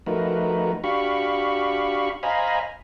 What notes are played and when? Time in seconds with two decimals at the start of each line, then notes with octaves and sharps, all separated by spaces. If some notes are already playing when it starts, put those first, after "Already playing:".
0.06 F3 A3 D#4 F#4 A#4 B4
0.84 D4 F#4 G4 F5 B5 C#6
2.23 C5 D#5 F5 G#5 A#5 B5